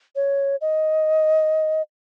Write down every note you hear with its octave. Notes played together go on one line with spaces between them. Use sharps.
C#5
D#5